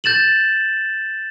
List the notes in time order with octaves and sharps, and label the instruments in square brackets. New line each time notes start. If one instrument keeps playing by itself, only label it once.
[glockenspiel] G6 A6 E7 F#7